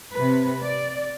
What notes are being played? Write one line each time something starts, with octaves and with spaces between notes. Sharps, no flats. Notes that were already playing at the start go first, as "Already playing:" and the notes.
C3 B4
D5